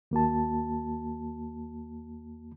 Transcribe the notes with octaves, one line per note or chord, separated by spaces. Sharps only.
D#2 A#3 F#4 A5